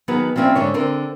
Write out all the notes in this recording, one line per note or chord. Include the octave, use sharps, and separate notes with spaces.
D#3 F#3 B3 D#4 G#4 B4
F3 G3 C4 C#4 E4
G#2 D3 C#5
D3 C4 A#4